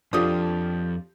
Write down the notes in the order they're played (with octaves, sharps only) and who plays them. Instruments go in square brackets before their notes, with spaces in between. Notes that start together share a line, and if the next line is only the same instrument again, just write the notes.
[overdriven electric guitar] F2 [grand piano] F3 G4 [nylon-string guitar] D4 F4 A4 [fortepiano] D#6